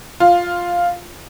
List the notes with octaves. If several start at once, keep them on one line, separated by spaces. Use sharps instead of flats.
F4